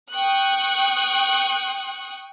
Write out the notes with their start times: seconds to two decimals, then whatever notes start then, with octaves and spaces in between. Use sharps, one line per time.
0.11 G5 C#6 D#6 F#6